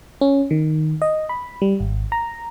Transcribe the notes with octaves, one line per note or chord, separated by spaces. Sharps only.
C#4
D#3
D#5
B5
G3
G#1
A#5